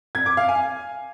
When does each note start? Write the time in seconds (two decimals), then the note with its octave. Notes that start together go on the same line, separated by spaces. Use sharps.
0.15 G#6
0.26 D6
0.37 F5
0.49 G#5